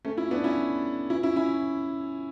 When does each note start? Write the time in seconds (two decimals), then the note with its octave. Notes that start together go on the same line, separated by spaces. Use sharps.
0.05 A3 C#4
0.17 C#4 E4
0.31 B3 D4
0.44 C#4 E4
1.10 C#4 E4
1.23 C#4 E4
1.36 C#4 E4